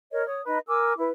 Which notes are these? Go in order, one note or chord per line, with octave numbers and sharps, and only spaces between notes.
A#4 C#5 D#5
C#5 D#6
D#4 B4 D#5
A#4 G#5 D6 E6
E4 B4